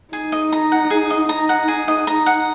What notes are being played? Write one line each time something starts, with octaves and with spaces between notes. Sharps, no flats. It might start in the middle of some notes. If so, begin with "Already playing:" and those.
D#4 G#4
D#5
A#5
F#5
G#4
D#5
D#4 A#5
F#5
G#4
D#5
A#5
F#5